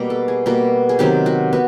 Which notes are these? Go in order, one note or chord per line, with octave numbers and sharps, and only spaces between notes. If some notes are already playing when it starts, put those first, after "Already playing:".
Already playing: B2 G3 A#3
A4
G#4
B2 G3 A#3 F#4
G#4
C3 D#3 F#3 B3 G4
F#4
B3 F#4